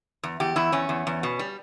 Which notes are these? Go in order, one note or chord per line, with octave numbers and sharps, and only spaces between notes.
E2
E2 G4
E2 E4
E2 C#4
E2
E2
B2
G3